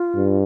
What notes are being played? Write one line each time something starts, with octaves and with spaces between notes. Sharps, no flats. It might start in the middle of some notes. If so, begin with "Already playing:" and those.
Already playing: F4
G2